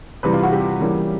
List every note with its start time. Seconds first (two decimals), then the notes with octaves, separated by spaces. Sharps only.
0.23 C3 E3 G3 B4
0.33 F4
0.43 F#4
0.52 G4
0.81 C#3 E3 G3 A#3